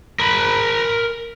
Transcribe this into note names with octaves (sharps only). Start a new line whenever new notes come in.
A#4 B5